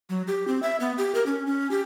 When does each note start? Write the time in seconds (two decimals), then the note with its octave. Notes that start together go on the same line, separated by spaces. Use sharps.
0.10 F#3
0.28 G4
0.48 C4
0.63 E5
0.80 B3
0.98 G4
1.15 A#4
1.26 C#4
1.46 C#4
1.71 G4